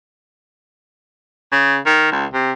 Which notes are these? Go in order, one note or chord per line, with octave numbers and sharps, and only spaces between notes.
C#3
D#3
C#2
C3